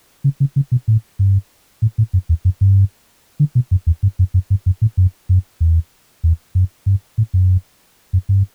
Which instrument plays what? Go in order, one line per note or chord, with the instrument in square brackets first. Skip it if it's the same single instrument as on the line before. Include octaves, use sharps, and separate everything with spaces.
[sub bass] C#3
C#3
C#3
B2
A2
G2
A2
A2
F#2
E2
F#2
G2
D3
B2
F#2
E2
G2
F#2
F#2
G2
F#2
A2
F#2
F#2
E2
E2
F#2
G2
A2
F#2
F#2
G2